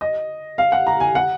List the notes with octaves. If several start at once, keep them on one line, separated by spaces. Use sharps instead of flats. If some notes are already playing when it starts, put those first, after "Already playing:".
D#5
F5
F#5
A#5
G#5
F#5